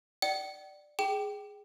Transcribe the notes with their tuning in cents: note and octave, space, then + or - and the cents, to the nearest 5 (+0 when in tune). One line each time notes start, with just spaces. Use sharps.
D5 +10 G5 -45
G#4 +0 G5 -15